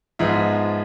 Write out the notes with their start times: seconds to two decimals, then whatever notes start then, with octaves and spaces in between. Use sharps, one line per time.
0.19 G#2 F3 G#3 B3 E5